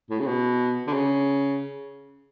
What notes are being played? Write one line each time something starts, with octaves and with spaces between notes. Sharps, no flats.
A2
C#3
B2
D3
C#3